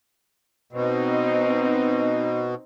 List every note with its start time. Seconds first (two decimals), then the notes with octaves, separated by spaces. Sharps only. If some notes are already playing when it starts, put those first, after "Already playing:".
0.73 B2 C4 D#4